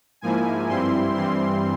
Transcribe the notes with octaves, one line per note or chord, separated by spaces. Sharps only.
G#2 F3 A#3 E4 G#5
G2 G3 C4 E4 C6
G2 E3 G3 C4 C6